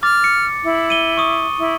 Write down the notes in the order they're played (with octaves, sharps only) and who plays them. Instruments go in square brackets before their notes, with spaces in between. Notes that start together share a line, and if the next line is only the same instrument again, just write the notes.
[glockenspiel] D6 A6 [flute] F6
[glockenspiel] C#7
[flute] E4
[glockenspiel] D#7 G7
C#6 D#6
[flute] E4